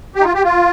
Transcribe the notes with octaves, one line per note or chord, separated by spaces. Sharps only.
G4
D#4
F4
G4
F4